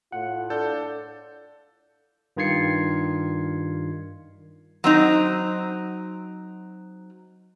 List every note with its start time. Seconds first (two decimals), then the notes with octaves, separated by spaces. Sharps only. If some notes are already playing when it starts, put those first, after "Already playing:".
0.12 A2 F4 F#5
0.50 D4 A4 G6
2.37 G2 D#3 F4 G#6 C7 C#7
4.84 F#3 C4 D#4